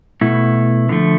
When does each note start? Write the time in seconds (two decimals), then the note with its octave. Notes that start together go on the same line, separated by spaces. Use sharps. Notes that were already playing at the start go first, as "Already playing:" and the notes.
0.21 B2 A3 E4
0.89 D3 F3 A3